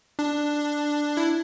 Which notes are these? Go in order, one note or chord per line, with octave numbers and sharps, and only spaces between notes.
D4
E4